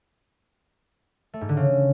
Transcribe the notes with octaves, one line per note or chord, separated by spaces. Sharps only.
A3
G#2
D3
C#3